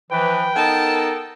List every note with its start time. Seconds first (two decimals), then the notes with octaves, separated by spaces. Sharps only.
0.11 E3 F3 B4 G5
0.56 B3 D#4 A4 A#4 A5